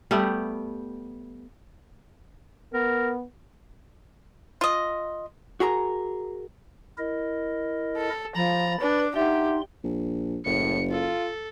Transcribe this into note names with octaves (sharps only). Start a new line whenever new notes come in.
G3 A3 B3 G4
B3 A#4
F4 D#5
F#4 G#4 A#4 A#5
E4 A#4 D#5
A4
F3 A#5 B5 A6
D4 B4
D#4 G4 E5 F#5 C6
A#1
F#1 A2 C#7
F4 A4